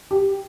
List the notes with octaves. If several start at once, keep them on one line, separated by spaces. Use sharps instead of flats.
G4